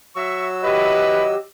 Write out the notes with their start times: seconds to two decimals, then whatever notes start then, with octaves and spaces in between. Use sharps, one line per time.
0.16 F#3 F#4 E5 C#6 E6
0.63 E4 G4 B4 D#5